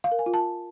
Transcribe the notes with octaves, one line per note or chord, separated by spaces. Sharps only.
F5
A#4
G#5
F4
A5